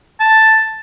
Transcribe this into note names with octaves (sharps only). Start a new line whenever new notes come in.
A5